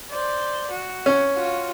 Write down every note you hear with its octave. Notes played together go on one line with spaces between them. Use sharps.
C5 D5
F#4
C#4
F4 F#4